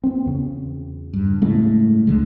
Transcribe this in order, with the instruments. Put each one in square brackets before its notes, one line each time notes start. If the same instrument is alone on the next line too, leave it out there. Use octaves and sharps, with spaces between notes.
[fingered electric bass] B3 C4
E2 C#3
[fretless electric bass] G2
[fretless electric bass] A2 [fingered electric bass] C#3 G#3 A3
[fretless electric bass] C#2 D3 G#3